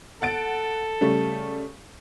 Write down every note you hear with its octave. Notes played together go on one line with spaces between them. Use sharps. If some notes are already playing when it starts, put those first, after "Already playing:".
A4 F#5 A6 D7
C#3 G3 A3